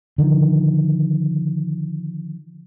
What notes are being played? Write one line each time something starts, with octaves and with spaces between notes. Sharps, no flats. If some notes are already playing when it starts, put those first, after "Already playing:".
D3 D#3 F3